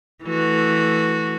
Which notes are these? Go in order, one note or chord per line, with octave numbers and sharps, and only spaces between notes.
E3 A3 F#4